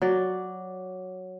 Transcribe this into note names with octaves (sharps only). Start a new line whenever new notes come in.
F#3 D5